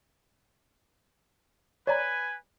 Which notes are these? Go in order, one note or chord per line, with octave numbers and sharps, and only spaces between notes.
B4 C#5 D5 G#5 A#5